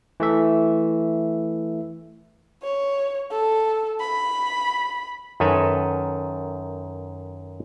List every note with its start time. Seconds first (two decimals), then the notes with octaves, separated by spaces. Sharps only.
0.20 E3 A3 E5
2.63 C#5
3.31 A4
4.00 B5
5.40 F#2 D#3 A4 B4 G#5 A#5